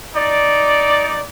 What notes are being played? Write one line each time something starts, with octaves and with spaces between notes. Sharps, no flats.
D#4 D5